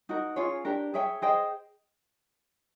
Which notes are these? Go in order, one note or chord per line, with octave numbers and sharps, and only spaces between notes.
D#4 F#4 A#4
C#4 F4 G#4 C#5
D4 G4 A#4
G#4 C#5 E5 G5
G#4 C5 D#5 G5